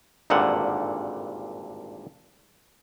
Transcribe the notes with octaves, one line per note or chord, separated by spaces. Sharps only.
G#1 G2 A#2 D3 F#5